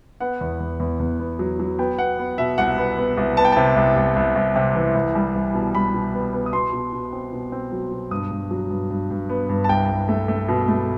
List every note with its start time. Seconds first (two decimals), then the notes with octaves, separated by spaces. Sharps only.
0.20 B3 F#5
0.41 E2
0.60 E2
0.80 E2
1.00 E2
1.20 B3
1.39 F#3
1.59 F#3
1.79 B3 G5
1.98 B3 F#5
2.19 B3
2.38 B2 E5
2.58 C2 F#5
2.78 B3
2.98 B3
3.17 C2
3.37 B3 A5
3.45 G5
3.52 C3 A5
3.76 C2
3.96 C2
4.16 C2
4.36 C2
4.56 C3
4.75 E3
4.95 C2
5.15 G3
5.35 C2
5.54 B2
5.74 G3 B5
5.94 B2
6.14 B3
6.33 B3
6.46 D#6
6.53 B2 C6
6.73 B2
6.93 B2
7.13 C4
7.32 B2
7.52 C4
7.72 F#3
7.92 B2
8.11 G2 D#6
8.31 G2
8.51 F#3
8.70 G2
8.90 G2
9.10 G2
9.29 B3
9.49 G2
9.64 A5
9.69 C2 G5
9.89 C2
10.09 A3
10.28 A3
10.48 B2
10.68 A3